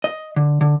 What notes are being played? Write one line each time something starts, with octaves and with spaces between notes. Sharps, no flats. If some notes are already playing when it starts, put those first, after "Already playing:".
D#5
D3
D3